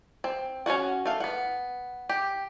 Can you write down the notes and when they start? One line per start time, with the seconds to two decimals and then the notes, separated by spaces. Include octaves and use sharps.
0.24 C4
0.66 C#4 F4 F#4 F#5
1.05 A3 F5
1.20 B3 F#5
2.09 G4